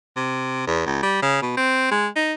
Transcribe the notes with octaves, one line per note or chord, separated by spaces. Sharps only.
C3
E2
C#2
G3
C#3
B2
C4
G#3
D#4